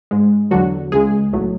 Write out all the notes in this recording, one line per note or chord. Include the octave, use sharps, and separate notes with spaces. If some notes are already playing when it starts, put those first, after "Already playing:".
G#2 G#3
E2 D3 F#3 F#4
C#2 C#3 G#3 G#4
B1 A2 F#3 A3